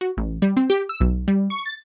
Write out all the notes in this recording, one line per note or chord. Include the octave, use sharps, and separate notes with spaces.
F#4
A1
G3
C4
G4
E6
B1
G3
C#6
A6